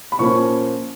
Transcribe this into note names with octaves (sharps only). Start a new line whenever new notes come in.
B5
A#2 F3 A#3 C#4 C#6